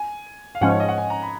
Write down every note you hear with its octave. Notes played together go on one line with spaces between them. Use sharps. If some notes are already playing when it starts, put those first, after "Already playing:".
Already playing: G#5
F5
G#2 F3 G#3 C#4 F#5
C#5
D#5
F#5
G#5
A#5
B5